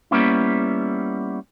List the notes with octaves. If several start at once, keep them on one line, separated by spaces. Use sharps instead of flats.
G3 A#3 B3 C#4 E4